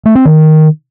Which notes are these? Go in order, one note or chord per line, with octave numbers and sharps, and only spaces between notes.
A3
C4
D#3